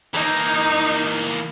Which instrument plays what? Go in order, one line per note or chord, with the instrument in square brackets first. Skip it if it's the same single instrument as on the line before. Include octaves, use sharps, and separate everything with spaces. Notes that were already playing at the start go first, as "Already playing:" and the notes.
[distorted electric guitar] E3 A#3 [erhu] D#4